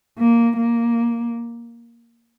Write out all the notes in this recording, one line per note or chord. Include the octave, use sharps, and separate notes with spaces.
A#3
A#3